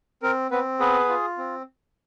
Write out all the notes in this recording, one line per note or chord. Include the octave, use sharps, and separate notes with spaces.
C4 A#4
B3 C4 B4
B3 G#4 B4
F4
C4